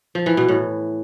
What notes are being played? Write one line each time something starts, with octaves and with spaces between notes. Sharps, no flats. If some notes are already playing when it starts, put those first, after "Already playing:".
F3
E3
B2
A2